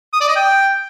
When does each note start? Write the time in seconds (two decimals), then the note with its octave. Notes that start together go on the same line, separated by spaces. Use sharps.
0.13 D#6
0.21 D5
0.28 D#5
0.36 G5